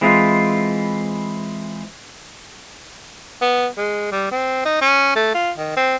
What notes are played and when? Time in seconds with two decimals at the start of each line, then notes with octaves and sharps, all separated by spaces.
0.01 E3 G#3 C4 E4 F4
3.41 B3
3.78 G#3
4.12 G3
4.31 C4
4.65 D#4
4.81 C#4
5.15 A3
5.34 F4
5.57 D#3
5.76 C4